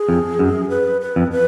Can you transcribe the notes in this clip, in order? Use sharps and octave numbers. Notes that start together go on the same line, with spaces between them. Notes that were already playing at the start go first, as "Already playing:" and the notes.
Already playing: G#4
F2
F#2
B4
B4
F2
B4